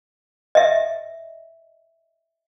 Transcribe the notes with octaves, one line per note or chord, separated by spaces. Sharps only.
D#5 E5